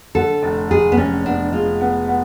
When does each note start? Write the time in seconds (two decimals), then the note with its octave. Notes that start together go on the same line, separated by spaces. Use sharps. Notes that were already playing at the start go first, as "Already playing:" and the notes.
0.15 D3 A4
0.43 F1
0.71 F1 G#4
0.92 B3
0.97 F1 C#4
1.25 B3 D4
1.53 G#3 F4
1.81 B3
2.08 B3